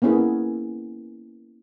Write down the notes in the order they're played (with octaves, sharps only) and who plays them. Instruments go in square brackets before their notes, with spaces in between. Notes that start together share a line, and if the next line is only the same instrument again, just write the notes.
[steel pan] A#3 B3 C#4 E4 G#4